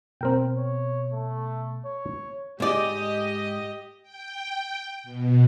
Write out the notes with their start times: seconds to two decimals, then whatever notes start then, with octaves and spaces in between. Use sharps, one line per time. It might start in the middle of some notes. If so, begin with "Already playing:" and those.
0.21 B2 C4 A#4 G5
0.58 C#5
1.12 A3
1.85 C#5
2.60 G#2 G4 D5 D#5
4.02 G5
5.04 B2